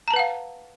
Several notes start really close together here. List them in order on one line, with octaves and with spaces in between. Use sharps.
A#5 A5 B4 F#5 F5